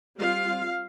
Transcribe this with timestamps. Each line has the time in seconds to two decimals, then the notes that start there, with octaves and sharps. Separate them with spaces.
0.17 G3 C4 F4 F5